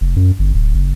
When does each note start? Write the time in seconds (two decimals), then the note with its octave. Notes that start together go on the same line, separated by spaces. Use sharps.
0.01 F1
0.16 F#2
0.39 G1
0.54 D1
0.75 F#1